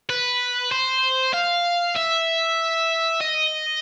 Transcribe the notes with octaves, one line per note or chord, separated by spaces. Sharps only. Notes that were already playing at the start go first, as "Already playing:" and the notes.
B4
C5
F5
E5
D#5